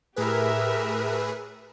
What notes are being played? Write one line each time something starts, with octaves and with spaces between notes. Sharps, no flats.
A2 G4 G#4 A#4 B4 E5